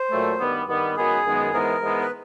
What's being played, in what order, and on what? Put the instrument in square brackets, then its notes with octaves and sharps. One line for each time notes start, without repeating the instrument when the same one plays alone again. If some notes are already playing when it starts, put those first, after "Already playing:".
Already playing: [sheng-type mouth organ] C5
[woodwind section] A#2 F#3 A3
G2 D#3 G3 B3
G2 D#3 G3 B3
[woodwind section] F#2 D#3 G#3 B3 [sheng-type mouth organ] G#4
[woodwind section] F#2 D#3 G#3 B3
[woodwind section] G#2 E3 G#3 B3 [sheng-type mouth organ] A#4
[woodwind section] G#2 E3 G#3 B3
[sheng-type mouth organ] B4